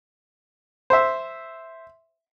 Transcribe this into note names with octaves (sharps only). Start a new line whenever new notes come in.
C5 E5